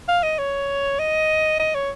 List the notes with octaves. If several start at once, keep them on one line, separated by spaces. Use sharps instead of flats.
F5
D#5
C#5
D#5
D#5
C#5